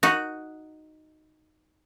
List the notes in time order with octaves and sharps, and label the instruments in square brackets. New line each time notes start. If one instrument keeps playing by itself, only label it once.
[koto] D#4 F#4